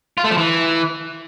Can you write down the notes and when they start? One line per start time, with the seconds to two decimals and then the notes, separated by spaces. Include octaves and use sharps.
0.18 F4
0.24 A3
0.31 F3
0.37 E3